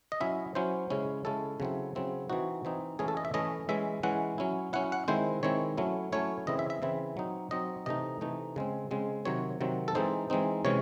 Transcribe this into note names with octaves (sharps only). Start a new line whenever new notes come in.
D#5
F#3 C#4 E4 E5
F#3 C#4 E4 C5
C#3 G#3 C#4 E4
C#3 G#3 C#4 E4 A4
C#3 F#3 C4 E4
C#3 F#3 C4 E4
E3 C4 D#4 F#4
E3 C4 D#4
E3 A3 C#4 E4 G#4
A4
D#5
E5
E3 A3 C#4 E4 D#5
E3 G#3 C#4 E4 E5
E3 G#3 C#4 E4 F#5
F#3 C#4 E4
F#3 C#4 E4 F#5
F#5
D#3 G#3 C4 E4 C5
D#3 G#3 C4 E4 C#5
F#3 A3 C#4 E4
F#3 A3 C#4 E4 C#5
C#3 E3 C4 E4 D#5
E5
E5
C#3 E3 C4 E4
F#3 C4 D#4
F#3 C4 D#4 D#5
C3 E3 A3 D#4 D#5
C3 E3 A3 D#4
C#3 G#3 C4
C#3 G#3 C4
C3 D#3 F#3 C4 C#5
C3 D#3 F#3 C4
A4
E3 G#3 C4 D#4 C5
E3 G#3 C4 D#4
C3 E3 G#3 C#4 C#5